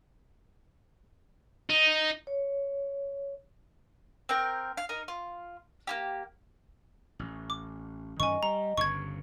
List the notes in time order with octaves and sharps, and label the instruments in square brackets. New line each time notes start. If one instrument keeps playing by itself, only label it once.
[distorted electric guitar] D#4
[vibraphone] C#5
[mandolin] C4 A#4 G5
F5
D#4 A#4
F4
A#3 E4 G4
[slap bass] A1
[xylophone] D6
[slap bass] F#2 D#3 C#4 [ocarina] D#5 [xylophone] G#5 C#6
[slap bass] G3 [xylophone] A#5
[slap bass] G1 G2 C#3 [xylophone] C#6 G#6